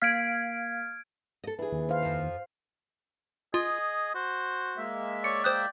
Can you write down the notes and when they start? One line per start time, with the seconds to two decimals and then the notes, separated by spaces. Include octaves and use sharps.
0.02 A#3 F5 F6 G#6 B6 D7
1.44 A4 D#5
1.59 E3 D4 G#4
1.72 D#2
1.89 C5 F5
2.03 F2 F3
3.54 F4 G#4 D#5
4.15 F#4 C5
4.77 G#3 A#3 E5
5.24 C#5 D5 C#7
5.44 C5 G5 D#6 F#6